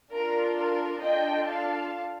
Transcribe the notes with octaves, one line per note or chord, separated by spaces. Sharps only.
D4 F4 A4 A#4
A#4
D4 F4 A4 D#5 G5
F5 A5